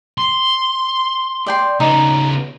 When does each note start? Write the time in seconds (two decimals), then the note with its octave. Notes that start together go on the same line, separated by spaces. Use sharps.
0.18 C6
1.46 D5 G5 C6
1.80 C#3 B3 D#4